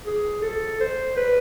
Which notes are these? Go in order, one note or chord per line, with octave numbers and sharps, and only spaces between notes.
G#4
A4
C5
B4